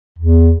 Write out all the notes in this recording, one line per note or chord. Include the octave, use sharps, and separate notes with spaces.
E2